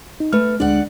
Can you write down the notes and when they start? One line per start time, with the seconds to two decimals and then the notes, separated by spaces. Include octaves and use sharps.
0.20 D#4
0.32 A3 B4 F6
0.60 D2 G#3 D4 D5 F#5